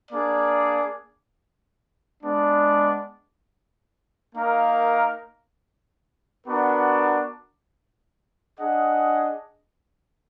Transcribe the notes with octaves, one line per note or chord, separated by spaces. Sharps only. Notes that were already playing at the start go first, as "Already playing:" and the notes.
A#3 D4 G#4 D5
G#3 B3 D4
A#3 D#4 A#4 F5
B3 D4 F#4 A#4
D4 G#4 D#5 F#5